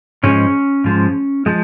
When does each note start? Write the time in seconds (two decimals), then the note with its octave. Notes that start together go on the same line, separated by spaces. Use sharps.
0.23 G#2 F3 G#3 C#4
0.84 G#2 F3 G#3
1.46 F3 G#3